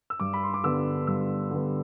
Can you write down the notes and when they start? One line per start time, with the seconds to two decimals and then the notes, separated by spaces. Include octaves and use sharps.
0.10 E6
0.20 G2 D6
0.34 B5
0.43 C6
0.54 D6
0.64 D3 G3 B3 E6
1.07 G2 E6
1.51 D3 G3 B3